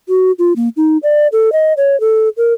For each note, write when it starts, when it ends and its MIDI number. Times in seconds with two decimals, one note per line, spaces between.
0.09 0.31 66
0.38 0.53 65
0.56 0.69 58
0.76 0.97 63
1.03 1.27 74
1.32 1.52 69
1.52 1.73 75
1.77 1.99 73
2.00 2.29 69
2.37 2.53 70